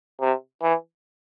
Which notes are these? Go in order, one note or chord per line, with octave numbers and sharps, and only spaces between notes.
C3
E3